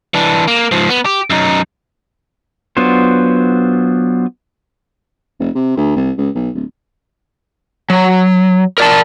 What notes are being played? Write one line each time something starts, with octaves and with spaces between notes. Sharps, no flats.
E3 D4
A#3
G#2 F3
B3
G4
F#2 D#4
F#3 B3 D4 F4 C5
F1
C3
D2
C2
C#2
B1
D1
F#3
A#4 D5 A5